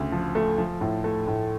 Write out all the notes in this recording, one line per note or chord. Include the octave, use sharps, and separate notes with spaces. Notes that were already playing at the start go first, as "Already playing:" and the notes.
Already playing: D2 C#3
F3
A3
F3
A2
A3
A2